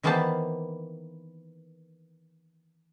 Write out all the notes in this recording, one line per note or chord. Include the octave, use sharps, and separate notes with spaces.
D#3 E3 A#3 B3 C5 A5